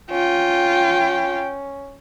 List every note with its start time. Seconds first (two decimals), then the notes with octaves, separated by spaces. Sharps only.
0.11 C#4 F4 G5